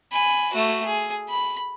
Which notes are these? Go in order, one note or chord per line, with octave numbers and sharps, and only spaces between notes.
G#5 B5
A3 F#4
G#4
B5